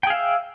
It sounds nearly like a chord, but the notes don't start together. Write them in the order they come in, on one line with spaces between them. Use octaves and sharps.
G5 G#4 F5 E5